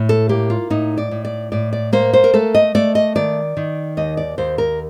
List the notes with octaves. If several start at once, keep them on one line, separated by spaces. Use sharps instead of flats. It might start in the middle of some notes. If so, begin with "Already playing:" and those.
Already playing: A2
A4
A#3 G4
F4
A2 D#4
D5
A2
D5
A2 D5
D5
A#3 C5
C5
A#4
A3 A4
D#5
A3 D5
D#5
D#3 D5
D#3
D#2 D#5
D5
D#2 C5
A#4